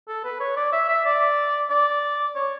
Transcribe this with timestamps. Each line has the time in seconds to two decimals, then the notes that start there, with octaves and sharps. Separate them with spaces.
0.08 A4
0.24 B4
0.40 C#5
0.57 D5
0.73 E5
0.89 E5
1.05 D5
1.70 D5
2.36 C#5